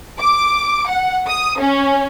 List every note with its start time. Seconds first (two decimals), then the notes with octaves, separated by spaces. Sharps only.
0.20 D6
0.87 F#5
1.27 D#6
1.59 C#4